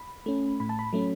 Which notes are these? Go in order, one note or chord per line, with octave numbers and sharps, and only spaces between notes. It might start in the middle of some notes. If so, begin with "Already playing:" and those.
Already playing: B5
A3 C#4
A2 B5
A5
B5
F#3 A3 C#4